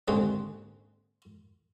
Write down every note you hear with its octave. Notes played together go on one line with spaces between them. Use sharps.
D#2 G#2 D3 C4 C#4